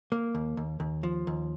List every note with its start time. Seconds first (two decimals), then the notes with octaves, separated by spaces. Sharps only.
0.12 A#3
0.35 D#2
0.57 D#2
0.80 D#2
1.03 F3
1.27 D#2